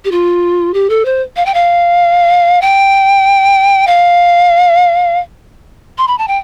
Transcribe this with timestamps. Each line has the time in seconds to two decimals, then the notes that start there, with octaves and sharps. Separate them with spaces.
0.05 G4
0.11 F4
0.74 G4
0.90 A4
1.05 C5
1.36 F5
1.46 G5
1.54 F5
2.62 G5
3.87 F5
5.98 C6
6.08 B5
6.18 A5
6.28 G5